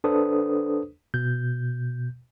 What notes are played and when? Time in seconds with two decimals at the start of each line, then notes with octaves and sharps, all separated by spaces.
0.04 D4 A4 B4 C5 D#6
1.14 B2 G6